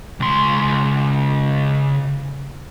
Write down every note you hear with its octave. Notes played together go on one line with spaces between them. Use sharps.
C#2 C6